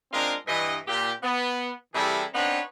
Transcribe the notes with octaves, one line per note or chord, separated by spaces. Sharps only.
G#3 C4 D4 F4 A#4
G2 E3 D#5
A#2 G4
B3
C3 E3 G3 E4 G#4 A4
B3 C4 D4 D#4 B4 C#5